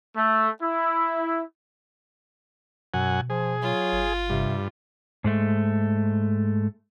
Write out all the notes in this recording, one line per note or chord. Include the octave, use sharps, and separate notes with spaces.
A3
E4
F#2 B2 F#5 G#5
F3 G#4
F#3 F4
G1
G2 C3
G#2 G#3 A3